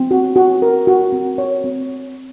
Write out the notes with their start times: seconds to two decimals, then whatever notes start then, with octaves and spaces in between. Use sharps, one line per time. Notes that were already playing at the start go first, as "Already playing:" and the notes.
Already playing: C4
0.11 F#4
0.36 F#4
0.62 A#4
0.87 F#4
1.12 C4
1.38 C#5
1.64 C4